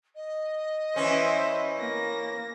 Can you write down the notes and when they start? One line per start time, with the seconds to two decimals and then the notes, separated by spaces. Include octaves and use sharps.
0.16 D#5
0.96 E3 C#4 C5 E5
1.80 A#3 A#6